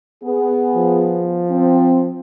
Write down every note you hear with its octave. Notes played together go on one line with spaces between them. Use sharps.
B3 G#4
F3
C4